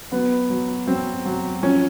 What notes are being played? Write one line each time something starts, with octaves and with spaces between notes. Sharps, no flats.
F#3 B3
F#3
F#3 C4
F#3
F3 C#4